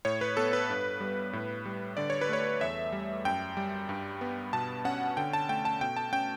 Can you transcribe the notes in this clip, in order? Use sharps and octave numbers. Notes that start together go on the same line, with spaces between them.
A2 C#5
B4
B3 A4
B4
G2
G3
A2
G3
D3 D5
C#5
B4
A3 C#5
E2 E5
G3
F#2 G5
G3
G2
B3
B2 A5
C#4 F#5
D3 G5
A5
A3 G5
A5
B2 G5
A5
C#4 G5